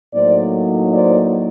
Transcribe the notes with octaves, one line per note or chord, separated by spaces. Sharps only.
A2 F#3 A#3 D#4 C5 D5
C5 D5